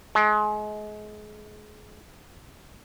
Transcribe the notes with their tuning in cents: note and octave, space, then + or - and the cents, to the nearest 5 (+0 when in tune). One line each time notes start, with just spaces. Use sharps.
G#3 +30